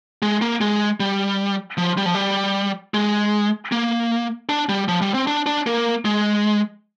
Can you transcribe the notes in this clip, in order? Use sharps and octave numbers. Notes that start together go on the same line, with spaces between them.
G#3
A#3
G#3
G3
F3
G3
F3
G3
G#3
A#3
D4
G3
F3
G3
C4
D4
D4
A#3
G#3